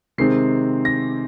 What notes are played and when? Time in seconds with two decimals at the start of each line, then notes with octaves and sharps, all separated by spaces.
0.18 C3 D#3 G#3 C4 C7
0.85 A#6